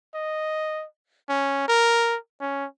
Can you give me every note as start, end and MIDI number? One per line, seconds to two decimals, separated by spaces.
0.14 0.85 75
1.29 1.66 61
1.68 2.17 70
2.40 2.66 61